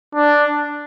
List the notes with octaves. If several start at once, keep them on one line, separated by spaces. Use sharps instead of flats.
D4